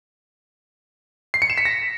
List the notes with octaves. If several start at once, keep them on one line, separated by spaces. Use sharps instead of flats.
C7
C#7
E7
B6
A#6